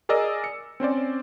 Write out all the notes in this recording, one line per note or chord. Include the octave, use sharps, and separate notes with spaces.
G#4 A#4 D5 D#5 E6
C#7
C4 C#4 C5 D5